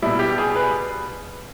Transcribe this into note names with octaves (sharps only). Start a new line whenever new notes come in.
B2 G3 E4
G4
G#4
B4